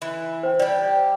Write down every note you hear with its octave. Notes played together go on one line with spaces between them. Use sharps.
E3
C5 G5
G3 G4 D5